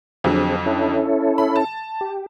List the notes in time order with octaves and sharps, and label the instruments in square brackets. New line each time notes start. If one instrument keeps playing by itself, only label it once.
[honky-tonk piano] F2 D3 F#3 [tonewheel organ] C4 G#4
[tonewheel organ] C#4 E4 A4
[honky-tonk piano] B5
A5
[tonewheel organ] G4